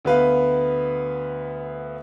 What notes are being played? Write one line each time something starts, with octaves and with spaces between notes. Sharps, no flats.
D2 B3 B4 F5